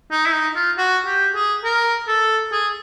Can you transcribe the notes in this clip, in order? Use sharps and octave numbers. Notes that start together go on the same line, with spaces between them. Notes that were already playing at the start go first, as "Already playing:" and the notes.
D#4
E4
D#4
F4
F#4
G4
G#4
A#4
A4
G#4